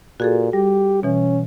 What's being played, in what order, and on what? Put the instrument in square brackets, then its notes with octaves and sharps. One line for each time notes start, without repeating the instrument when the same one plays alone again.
[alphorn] A#2 [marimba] F#4 G#4 A4
[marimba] G3 [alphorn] G4
[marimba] B2 E3 [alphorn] C#4